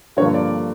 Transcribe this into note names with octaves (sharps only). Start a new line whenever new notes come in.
G2 D3 F3 A#3 C#5
D5